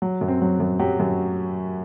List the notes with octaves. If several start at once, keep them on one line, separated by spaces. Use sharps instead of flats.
F#3
F#2
C4
F#3
F#2
F#3 G4
F#2